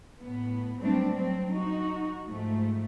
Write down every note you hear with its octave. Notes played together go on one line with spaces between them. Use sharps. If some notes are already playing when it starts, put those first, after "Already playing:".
A2 B3
F#3 G3 A3 C4 D4
F#3 C4
D#4 F#4
G#2 F3 A3